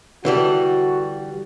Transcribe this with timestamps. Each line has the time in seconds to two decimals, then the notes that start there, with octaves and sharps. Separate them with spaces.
0.25 D3 E3 G3 F#4